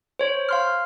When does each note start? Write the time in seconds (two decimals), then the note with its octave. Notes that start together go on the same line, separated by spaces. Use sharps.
0.19 C5 C#5
0.49 F5 C6 F6